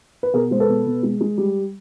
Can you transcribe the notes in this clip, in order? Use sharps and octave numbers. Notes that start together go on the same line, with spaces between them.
B4
B2 G#4 A#4
G#3 C5
A4 B4
B2
B2
G#3
G#3
G3